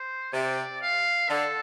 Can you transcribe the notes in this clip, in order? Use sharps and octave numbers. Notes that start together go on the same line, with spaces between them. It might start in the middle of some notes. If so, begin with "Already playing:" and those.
Already playing: C5
C3 D5
F5
D3 A4